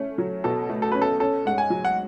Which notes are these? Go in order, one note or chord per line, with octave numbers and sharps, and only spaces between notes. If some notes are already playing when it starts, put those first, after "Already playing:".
Already playing: A3 C#4
F#3
B2 A4
A3
A4
C#4 B4
A4
C#4 A4
G#2 F#5
G#5
F#3
F#5